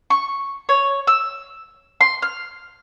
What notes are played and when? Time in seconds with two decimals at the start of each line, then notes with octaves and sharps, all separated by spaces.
0.10 C#6
0.69 C#5
1.07 E6
2.01 C6
2.22 F6